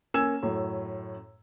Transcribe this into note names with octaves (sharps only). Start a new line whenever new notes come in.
A#3 C#4 G#5 E6 G#6 E7
F#2 A2